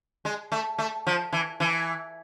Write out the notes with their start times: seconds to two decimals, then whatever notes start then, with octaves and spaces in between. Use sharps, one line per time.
0.25 G#3
0.52 A3
0.78 A3
1.07 F3
1.33 E3
1.60 E3